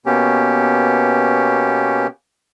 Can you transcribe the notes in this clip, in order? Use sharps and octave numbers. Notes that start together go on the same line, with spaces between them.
B2 A#3 B3 C#4 G4